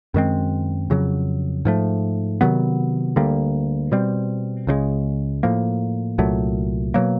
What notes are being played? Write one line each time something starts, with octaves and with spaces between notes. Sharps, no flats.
F#2 D#3 G#3 C4
F2 C#3 F#3
G#2 F3 A3
C3 D#3 F#3 B3
D2 D3 G3 A#3
B2 G3 C4
C#2 C#3 F3 G#3
A2 F3 A#3
C2 A#2 F#3 A3
B2 F#3 A#3